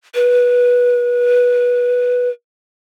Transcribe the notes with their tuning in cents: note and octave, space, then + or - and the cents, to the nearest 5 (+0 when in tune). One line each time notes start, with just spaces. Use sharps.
B4 -15